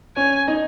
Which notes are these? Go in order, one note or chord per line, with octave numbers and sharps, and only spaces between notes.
C#4 C#5 G#5
D#4 D#5